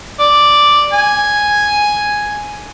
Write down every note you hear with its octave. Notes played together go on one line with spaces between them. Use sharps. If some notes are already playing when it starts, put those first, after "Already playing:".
D5
G#5